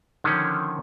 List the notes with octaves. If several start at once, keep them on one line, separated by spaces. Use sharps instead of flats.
D3 D#3 F3 C#4